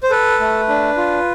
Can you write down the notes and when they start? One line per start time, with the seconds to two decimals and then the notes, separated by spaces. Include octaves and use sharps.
0.03 C5
0.10 A4 B4
0.40 A3
0.69 D4
0.97 F4